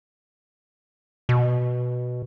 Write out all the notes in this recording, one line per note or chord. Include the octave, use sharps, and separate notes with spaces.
B2